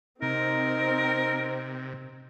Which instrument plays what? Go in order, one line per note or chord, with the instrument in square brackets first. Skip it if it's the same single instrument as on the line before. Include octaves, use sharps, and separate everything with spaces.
[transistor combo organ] C3 [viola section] C4 [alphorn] D#4 [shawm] A#4